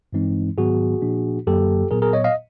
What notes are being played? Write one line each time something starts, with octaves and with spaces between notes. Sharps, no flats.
G2 E3 G#3 C4 D#4
G#2 D#3 F#3 B3 F#4 G#4
A#2 F3 A#3 D4
F#2 D3 F#3 A#3 G4 A4
A#2 F#3 B3 G#4 A#4
G#4 A#4
C#5 D#5
D#5 F5